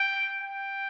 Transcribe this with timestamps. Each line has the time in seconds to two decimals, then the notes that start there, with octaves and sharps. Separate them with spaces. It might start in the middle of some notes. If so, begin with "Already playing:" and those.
Already playing: G5
0.42 G5